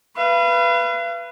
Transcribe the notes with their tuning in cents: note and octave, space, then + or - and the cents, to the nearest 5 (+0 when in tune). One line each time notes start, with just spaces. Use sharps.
B4 +0 F5 -40